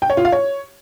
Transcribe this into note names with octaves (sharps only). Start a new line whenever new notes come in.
G5
C#5
F4
F5
C#5